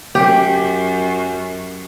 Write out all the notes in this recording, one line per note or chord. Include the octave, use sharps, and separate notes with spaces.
F#2 G4